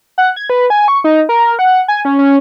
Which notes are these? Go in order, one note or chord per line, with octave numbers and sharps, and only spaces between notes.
F#5
G#6
B4
G#5
C#6
D#4
A#4
F#5
G#5
C#4
C#4